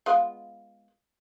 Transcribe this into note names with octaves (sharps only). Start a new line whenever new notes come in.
G#3 B3 F4